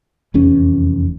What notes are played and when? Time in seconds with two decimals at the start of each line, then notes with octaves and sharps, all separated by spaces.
0.34 F1 E2 C#4